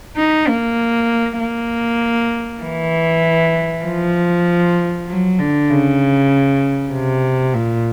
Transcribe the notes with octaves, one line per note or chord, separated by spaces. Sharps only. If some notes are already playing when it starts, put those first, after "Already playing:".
D#4
A#3
A#3
E3
F3
F#3
D3
C#3
C3
A#2